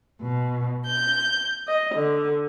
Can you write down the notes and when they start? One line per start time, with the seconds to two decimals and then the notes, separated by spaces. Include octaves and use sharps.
0.22 B2
0.86 G6
1.67 D#5
1.96 D3